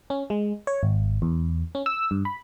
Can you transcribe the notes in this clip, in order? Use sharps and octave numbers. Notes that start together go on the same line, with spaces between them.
C#4
G#3
C#5
G#1
E2
C#4
E6
G2
B5